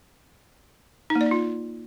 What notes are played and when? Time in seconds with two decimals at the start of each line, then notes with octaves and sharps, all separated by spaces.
1.10 D#4
1.15 A#3
1.21 D5
1.26 D#4
1.31 F4